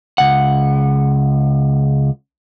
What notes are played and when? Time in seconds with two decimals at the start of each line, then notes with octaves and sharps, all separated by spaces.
0.18 C#2 F#5